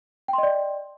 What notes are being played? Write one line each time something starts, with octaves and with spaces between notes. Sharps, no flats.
D5 D#5 G5 C6